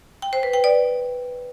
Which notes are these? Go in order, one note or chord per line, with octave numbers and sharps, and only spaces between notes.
G5
C5
B4
G5
D5